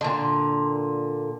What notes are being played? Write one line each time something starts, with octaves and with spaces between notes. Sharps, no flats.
A#2 D3